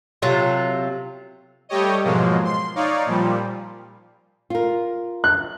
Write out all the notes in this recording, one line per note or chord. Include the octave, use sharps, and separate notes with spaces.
C3 F#3 F4 A4
G3 A3 G4 C#5 D#5
G#2 B2 F3 F#3 G#3 A#3
C6
D#4 C#5 D5 F5
A#2 F3 G3
F4 A#4
F#6